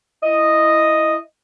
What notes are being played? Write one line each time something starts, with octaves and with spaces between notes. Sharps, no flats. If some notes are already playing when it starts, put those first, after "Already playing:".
E4 D#5